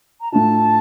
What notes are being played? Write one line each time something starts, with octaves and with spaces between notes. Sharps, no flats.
A#5
A2 A3 D4 F4 A5